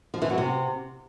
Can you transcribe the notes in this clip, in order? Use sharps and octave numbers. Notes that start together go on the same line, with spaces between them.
F3
E3
F#3
C3